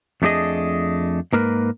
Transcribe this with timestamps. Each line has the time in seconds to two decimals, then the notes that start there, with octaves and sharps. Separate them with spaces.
0.22 F2 A3 D4 G#4 D#5
1.33 G#2 A#3 A#4 B4